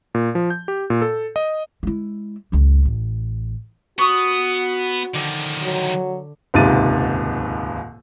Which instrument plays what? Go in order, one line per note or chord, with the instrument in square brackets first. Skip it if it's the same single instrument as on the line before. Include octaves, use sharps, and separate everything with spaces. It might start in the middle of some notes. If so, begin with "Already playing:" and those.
[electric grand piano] A#2
F3
G6
G4
A#2
A4
D#5
[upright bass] G#3 E4
C#2 F#2
A1
[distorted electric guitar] B3 [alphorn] F#4 [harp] C#6 D#6
[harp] D3 [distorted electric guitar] D#3 F3
[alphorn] F#3
[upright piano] D#1 C#2 G#2 C3 A6 D#7